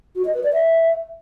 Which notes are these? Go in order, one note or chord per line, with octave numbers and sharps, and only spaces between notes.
F#4
D#5
B4
D5
E5